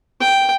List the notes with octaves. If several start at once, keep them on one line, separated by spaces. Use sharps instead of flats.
G5